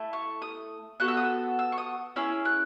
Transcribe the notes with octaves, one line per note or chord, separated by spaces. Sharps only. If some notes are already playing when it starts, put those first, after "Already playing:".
Already playing: A3 E4 A4
C#6
D#6
B3 F#4 A4 F#6
E6
D#6
E6
E6
C#6
D#6
C#4 E4 G#4 E6
F#6